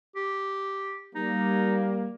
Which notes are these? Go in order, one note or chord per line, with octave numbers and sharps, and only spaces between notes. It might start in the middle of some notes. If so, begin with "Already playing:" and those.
G4
G3 A#3 D#4